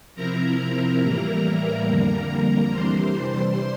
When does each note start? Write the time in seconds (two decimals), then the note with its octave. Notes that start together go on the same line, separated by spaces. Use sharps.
0.15 C3 F3 C4 E4 A#4 A#5
1.01 A2 E3 G3 A#3 E4 A#4 A#5
1.87 F2 D3 G3 A#3 A#4 A#5
2.72 C3 E3 G3 D4 C5 C6
3.15 C5 C6